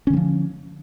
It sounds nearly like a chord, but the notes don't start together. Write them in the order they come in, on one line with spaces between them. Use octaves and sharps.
C#4 D3 G3 F3